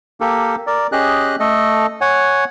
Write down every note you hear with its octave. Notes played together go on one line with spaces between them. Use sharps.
A#3 G4 A4 A#4
A#4 D5
C#4 G4 G#4 D#5 F#6
A3 A4 D#5
C#5 F#5 G#5